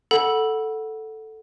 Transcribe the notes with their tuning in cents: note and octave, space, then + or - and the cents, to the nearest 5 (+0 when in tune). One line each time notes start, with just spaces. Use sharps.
A4 +0 F#5 +0 B5 -25